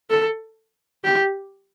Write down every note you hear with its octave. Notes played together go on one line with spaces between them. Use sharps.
A4
G4